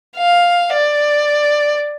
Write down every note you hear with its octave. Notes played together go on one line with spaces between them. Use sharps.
F5
D5